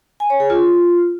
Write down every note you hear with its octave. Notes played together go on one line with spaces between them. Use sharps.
G#5
C#5
G#4
F4